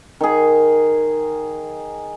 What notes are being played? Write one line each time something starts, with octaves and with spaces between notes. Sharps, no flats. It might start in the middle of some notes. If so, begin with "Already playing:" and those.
D#3 G#4